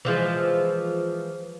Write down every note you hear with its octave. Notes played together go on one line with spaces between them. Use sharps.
E3 F3 G#3